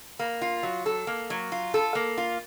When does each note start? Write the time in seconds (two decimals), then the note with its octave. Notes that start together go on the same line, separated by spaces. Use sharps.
0.19 A#3
0.42 F4
0.63 F#3
0.86 A4
1.07 A#3
1.30 F#3
1.52 F4
1.74 A4
1.95 A#3
2.18 F4